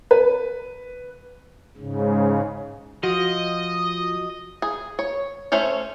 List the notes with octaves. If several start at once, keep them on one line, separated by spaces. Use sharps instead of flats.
B4
G#2 C#3
F3 F#4 D#5
G#4
C#5
A3 C#4 C5 C#5